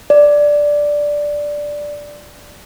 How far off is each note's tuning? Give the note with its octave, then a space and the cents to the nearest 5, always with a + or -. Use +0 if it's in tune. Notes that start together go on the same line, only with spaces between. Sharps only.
D5 +0